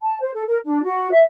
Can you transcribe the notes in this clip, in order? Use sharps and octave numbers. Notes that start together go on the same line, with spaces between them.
A5
C5
A4
A#4
D4
F#4
E5